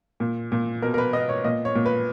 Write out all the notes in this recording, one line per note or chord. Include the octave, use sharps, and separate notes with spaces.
A#2
A#2
B2 A#4
A#4
B4
B3 D#5
C#5
A#2 D#5
C#5
A#2
B4